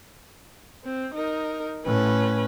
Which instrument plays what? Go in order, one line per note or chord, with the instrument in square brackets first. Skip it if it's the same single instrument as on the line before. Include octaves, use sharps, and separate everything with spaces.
[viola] C4
D#4 A#4
[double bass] A2 [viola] C#4 B4